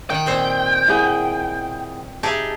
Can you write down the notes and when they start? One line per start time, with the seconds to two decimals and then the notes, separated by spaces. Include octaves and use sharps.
0.10 D#3 F#5 G5
0.26 A#2 C4 C5
0.88 E4 G#4 F#5
2.23 D#4 G4 G#4 E5 A5